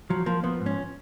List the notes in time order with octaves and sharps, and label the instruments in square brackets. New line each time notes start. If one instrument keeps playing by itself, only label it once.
[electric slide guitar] F3 [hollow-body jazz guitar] F#3
[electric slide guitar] F3 [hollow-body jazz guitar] A#3
[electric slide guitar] F3 [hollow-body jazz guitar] B3
[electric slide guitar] G#2
[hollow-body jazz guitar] C#4